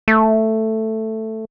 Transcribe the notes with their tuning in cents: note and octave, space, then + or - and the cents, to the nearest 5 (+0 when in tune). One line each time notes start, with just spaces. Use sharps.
A3 +5